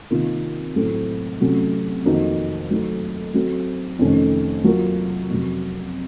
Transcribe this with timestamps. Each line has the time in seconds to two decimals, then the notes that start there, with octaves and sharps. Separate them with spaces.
0.11 C3 D#3 A#3 F4
0.76 A2 F#3 A3 C4
1.40 C3 F#3 A3 C#4
2.06 F2 D#3 A#3 D#4 F#4
2.70 F#3 A3 D#4 A4
3.34 F#3 C4 F#4 A4
3.99 F2 C3 D#3 A3 C#4
4.64 F#3 A#3 F4 A#4
5.29 F2 C3 F#3